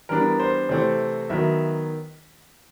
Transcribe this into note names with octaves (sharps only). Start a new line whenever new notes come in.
E3 G3 B3 D4 A#4
C5
C3 E3 A3 C4 C#5
D#3 F#3 B3 E5